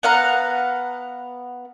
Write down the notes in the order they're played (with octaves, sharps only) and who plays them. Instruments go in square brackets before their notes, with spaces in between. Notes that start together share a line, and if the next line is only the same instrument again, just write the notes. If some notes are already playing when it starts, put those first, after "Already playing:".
[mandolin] B3 F5 F#5 A#5